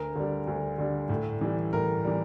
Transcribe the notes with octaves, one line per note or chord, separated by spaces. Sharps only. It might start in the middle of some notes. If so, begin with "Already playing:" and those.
Already playing: D2 A#4
D3 G3
D2
D3 G3
A2
E3 G3
A2 A#4
E3 G3